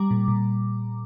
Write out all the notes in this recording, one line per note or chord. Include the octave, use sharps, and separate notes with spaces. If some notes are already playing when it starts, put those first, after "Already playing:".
Already playing: G3 A#5 D6
A#2
A#2